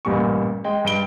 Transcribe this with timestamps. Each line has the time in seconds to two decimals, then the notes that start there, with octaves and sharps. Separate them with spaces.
0.05 A1 G2 A#2 G3 C#6
0.64 G#3 G5
0.84 G2 G5 D7 G7